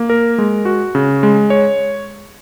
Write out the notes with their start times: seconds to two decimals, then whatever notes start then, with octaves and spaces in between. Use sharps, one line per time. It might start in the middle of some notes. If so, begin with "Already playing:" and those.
Already playing: A#3
0.10 A#4
0.38 G#3
0.65 F#4
0.95 C#3
1.23 G#3
1.50 C#5